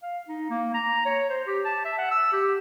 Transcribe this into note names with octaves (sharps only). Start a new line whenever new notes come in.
F5
D#4
A#3
A#5
C#5
C5
G4
A5
E5
F#5
E6
G4